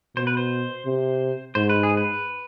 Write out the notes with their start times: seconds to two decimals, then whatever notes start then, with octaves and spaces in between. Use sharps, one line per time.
0.16 B2 C5
0.27 B4
0.37 C5
0.86 C3
1.55 G#2 C5
1.69 B4
1.83 G#4
1.97 B4